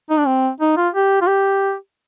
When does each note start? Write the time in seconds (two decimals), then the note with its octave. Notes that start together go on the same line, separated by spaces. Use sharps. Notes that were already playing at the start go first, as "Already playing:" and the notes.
0.10 D#4
0.19 D4
0.27 C4
0.61 D#4
0.77 F4
0.94 G4
1.22 F4
1.28 G4